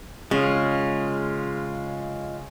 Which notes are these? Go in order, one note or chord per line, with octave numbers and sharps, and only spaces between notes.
C#3 G#3 F4